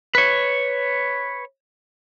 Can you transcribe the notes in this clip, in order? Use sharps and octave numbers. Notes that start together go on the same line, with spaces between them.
B4 C#5